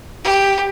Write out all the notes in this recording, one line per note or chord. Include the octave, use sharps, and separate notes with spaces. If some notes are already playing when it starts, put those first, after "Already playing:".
G4